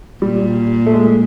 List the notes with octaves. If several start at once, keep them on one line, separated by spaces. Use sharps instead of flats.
A#2 G3
A3
G#3